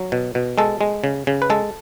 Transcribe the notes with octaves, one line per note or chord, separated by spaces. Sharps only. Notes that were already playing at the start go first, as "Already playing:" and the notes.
Already playing: F#3
B2
B2
G#3 A4
G#3
C#3
C#3
B4
G#3 A4